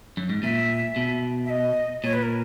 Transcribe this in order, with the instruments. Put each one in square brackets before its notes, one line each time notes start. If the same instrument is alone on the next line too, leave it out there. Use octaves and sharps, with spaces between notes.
[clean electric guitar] F#2
G#2
[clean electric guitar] A#2 [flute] E5
[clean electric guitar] B2
[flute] E5
D#5
[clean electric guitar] A#2 [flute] C#5
[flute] B4
A#4